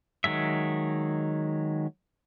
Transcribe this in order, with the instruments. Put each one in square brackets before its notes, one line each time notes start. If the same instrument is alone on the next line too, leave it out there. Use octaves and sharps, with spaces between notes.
[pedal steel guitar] D#3 F#3 G#3 E5